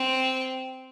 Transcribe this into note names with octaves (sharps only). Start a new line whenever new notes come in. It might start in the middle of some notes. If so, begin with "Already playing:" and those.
Already playing: C4